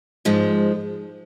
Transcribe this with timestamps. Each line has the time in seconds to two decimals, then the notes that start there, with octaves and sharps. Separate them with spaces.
0.25 G#2 F3 G#3